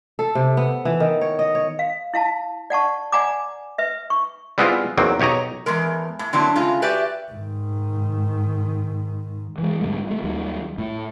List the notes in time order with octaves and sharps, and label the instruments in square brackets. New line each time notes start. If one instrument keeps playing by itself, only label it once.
[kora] A4
C3
B3
E3
D#3
C#5
D#5
C#5
[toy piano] F5
E4 F5 A5
D5 F#5 A5 C#6
D5 F#5 G#5 A#5 D6
B4 E5
C#6
[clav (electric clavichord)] G3 G#3 B3 C4 E4 F4
E2 D#3 F#3 A#3 C4
B1 G4 C#5 D#5 A#5
[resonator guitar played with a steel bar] E2 A2 G#3 A#4
A2
D3 F#3 A#3 C4 D4 E4
C#3 G#3 A3 F4
F#4 G4 B4 D5 E5
[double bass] G#2 D#3
[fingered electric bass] E3 G#3
G#2 D3 G3 A3
G#3 A3
D#2 D#3 F#3 G3
A2